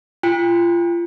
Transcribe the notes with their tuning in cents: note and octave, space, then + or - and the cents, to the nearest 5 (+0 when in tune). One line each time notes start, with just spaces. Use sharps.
F4 -30 G5 +35